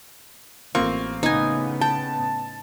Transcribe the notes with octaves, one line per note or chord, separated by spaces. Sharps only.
A1 A#3 C4 F4 C#6
A2 C#3 B3 D#4 G#5
G5 A5